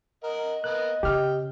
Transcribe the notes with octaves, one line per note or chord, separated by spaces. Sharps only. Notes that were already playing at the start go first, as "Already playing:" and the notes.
A#4 D#5 F#5
A#3 B3 F#6
C#3 G4 G5 F6